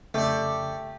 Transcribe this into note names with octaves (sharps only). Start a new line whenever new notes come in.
F2 C#3 A3 G4 A4 D5